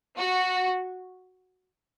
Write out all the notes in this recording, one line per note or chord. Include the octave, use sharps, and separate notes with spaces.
F#4